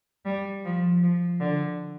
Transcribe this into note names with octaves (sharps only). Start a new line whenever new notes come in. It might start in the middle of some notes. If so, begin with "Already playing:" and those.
G3
F3
F3
D3